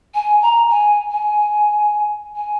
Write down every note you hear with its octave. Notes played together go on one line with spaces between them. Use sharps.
G#5
A#5
G#5
G#5
G#5